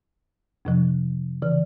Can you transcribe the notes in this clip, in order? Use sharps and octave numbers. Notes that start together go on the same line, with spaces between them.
F2 C3 F3
C#3 E3